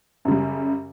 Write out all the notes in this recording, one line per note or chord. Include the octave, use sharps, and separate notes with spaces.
F#2 C#3 G3